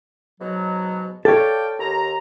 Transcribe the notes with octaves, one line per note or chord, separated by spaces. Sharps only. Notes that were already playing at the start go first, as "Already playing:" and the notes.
G#2 B2 F#3
A4 C#5 D5 F5 G5
D#2 A#5